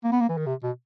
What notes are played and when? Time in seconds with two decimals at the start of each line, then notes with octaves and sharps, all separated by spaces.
0.04 A#3
0.12 B3
0.20 A#3
0.29 E3
0.37 D#3
0.46 C3
0.63 B2